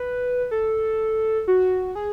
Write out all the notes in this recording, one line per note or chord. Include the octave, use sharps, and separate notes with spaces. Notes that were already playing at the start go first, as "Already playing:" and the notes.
Already playing: B4
A4
F#4
G#4